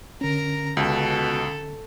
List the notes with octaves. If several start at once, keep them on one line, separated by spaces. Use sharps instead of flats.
D3 C#4 A#4 A#5
C#2 B2 A4